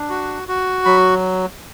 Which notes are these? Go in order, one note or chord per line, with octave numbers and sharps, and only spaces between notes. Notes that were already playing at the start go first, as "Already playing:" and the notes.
Already playing: D4
F#4
F#4
F#3 B5